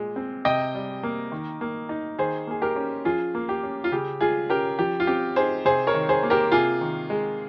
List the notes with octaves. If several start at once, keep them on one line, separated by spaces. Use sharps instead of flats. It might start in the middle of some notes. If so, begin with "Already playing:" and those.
Already playing: A#2 G#3
C4
C3 D#5 G5
G3
A#3
D#3
A#3
D#4
D#3 G#4 C5
A#3 G#4
G4 A#4
C#4
F3 F4 G#4
A#3
G4
C#4
F4
C#3 G4
G#3 F4 G#4
C#4 G4 A#4
F3 G4
F4
C4 G4
D#4 G#4 C5
C3 G#4 C5
A#4 C#5
D#3
G#4 C5
A#3
G4 A#4
C3 F4 G#4
D#3
G#3